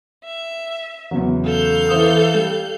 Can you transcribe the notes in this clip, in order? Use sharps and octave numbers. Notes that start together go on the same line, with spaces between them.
E5
E2 C#3 F#3
A4 F5 G6
E3 C5 D#6
G3